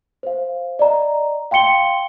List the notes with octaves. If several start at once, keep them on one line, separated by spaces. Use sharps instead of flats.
C5 F5
D5 D#5 A#5
F5 G5 C6 C#7 G7